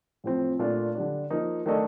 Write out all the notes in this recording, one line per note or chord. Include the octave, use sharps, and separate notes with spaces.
A2 F3 C4
A#2 A3 D4 F4 A#4
D3 G3 D4
F3 A#3 D#4
D#3 A3 D4 A4 D#5